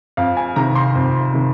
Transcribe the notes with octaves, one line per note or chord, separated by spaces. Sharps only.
F2 F5
G#5
C3 D#3 A#5
C6
F2
C3 D#3